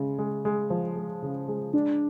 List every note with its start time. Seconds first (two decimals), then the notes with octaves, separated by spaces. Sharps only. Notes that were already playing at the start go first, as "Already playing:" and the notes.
Already playing: C#3 G#3
0.19 G#3
0.45 G#3
0.70 F3
0.96 G#3
1.22 C#3
1.48 G#3
1.73 G#3 D4